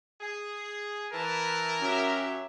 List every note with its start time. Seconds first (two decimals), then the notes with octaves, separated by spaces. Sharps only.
0.21 G#4
1.13 E3 A#4 B4 A5
1.81 F#2 F#3 C#4 G4 E5